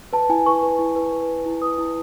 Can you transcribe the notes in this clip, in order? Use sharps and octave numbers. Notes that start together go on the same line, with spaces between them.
B4 A5
E4 G#5
B4 C#6
B4
E4
B4
B4
B4
E4
B4 D#6
E4